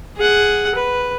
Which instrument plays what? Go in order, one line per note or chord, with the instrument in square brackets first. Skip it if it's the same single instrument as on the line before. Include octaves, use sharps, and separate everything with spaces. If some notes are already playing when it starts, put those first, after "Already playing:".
[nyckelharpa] G#4 F#5
B4